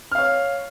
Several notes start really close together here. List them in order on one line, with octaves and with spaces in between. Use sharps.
F6 F5 C#5